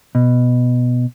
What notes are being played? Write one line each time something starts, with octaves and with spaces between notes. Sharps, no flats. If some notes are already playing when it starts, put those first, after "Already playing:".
B2